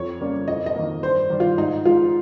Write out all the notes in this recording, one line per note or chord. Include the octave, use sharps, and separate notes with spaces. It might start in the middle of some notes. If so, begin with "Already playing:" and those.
Already playing: F2 C#5
C#3 G3 A#3
F2 D#5
D#5
D#3 A#3
G2 C5
D#3 G3
F4
G#2 D#4
F3 G#3 F4